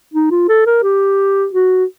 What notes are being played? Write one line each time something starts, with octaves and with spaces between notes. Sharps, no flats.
D#4
F4
A4
A#4
G4
F#4